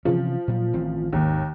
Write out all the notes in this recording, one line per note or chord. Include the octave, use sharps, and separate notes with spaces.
C3 E3 F3 C#4
A#2 F#3
A1 D#3 C4
G#1 D#2 B2 A#3